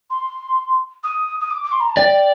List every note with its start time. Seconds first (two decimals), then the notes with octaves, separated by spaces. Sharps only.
0.10 C6
1.03 D#6
1.40 D#6
1.50 D6
1.63 D6
1.71 C6
1.80 A#5
1.89 A5
1.96 D5 G5